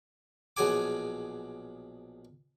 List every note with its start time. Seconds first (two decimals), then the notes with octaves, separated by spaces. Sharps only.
0.57 A#1 B2 F#3 G#4 G#5 D6